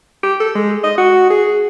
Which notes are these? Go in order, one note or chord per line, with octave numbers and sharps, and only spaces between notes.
G4
A4
G#3
D#5
F#4
G#4